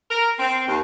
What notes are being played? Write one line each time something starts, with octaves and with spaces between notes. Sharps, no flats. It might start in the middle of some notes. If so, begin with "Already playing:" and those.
A#4
C4
D#2